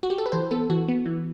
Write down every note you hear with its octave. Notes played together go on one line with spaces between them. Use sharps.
F#4
G4
A4
B4
E3 C5
B3 A4
E3 F#4
B3
E3